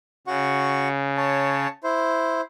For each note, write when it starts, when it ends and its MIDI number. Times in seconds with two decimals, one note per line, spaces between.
0.27 1.67 49
0.27 0.88 66
0.27 0.88 78
0.27 0.88 85
1.17 1.68 73
1.17 1.68 81
1.84 2.41 64
1.84 2.41 72